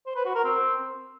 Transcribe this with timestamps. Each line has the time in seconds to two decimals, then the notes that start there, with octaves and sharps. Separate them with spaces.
0.06 C5
0.16 B4
0.25 F#4
0.35 A#4
0.45 C4